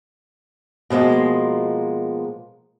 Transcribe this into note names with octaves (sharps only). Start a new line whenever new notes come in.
B2 F3 G#3 A#3